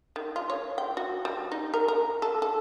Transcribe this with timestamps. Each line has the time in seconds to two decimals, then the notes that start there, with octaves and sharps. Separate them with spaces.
0.16 D#3
0.36 F4
0.50 C#5
0.78 G5
0.97 F#4
1.25 G3
1.52 D#4
1.74 A#4
1.88 A#4
2.22 A4
2.42 A4